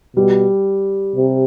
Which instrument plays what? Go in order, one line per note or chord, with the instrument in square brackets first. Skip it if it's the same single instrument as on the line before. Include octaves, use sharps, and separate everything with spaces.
[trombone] B2 [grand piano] G3
[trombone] C3